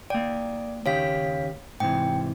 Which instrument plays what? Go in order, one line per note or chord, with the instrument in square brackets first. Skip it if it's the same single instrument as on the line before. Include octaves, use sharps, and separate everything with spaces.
[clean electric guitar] A#3 G5 [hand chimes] D5
[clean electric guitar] D#2 C#3 G4 [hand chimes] C#5 F5 B6
[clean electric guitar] G#2 C3 E3 [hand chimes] G5